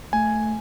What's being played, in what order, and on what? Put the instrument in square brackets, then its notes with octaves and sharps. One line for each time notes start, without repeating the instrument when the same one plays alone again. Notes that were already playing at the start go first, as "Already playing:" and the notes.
[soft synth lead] A3 [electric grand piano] G#5